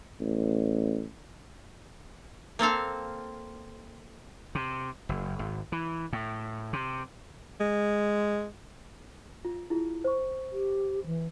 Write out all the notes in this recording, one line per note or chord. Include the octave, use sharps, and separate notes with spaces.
A1
A#3 C4 A4 F5
C3
F#1
G#1
E3
A2
C3
G#3
F4
E4 F4 G#4
C5 C#6
G4
E3